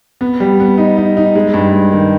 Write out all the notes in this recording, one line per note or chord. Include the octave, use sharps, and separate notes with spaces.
B3
G3
B3
D#4
D#4
D#4
G#3
G2
G#3
D#3